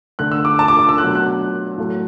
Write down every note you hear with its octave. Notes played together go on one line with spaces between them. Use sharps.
D3 A3 F#6
E6
D6
A5
D6
D6
E6
B2 F#3 A3 F#6
F#6
A2 F#3 A3